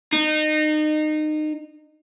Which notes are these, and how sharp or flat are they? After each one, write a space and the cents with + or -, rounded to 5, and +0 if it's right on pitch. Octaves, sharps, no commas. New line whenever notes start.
D#4 -25